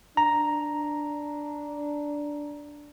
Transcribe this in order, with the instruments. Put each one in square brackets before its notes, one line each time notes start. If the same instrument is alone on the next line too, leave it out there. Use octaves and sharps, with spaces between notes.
[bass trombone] D4 [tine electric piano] A#5